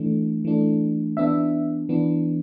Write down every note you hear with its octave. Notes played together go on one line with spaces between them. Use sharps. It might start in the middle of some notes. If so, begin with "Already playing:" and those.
Already playing: E3 A3 D4
E3 A3 D4
E3 B3 D4 E5
E3 B3 D4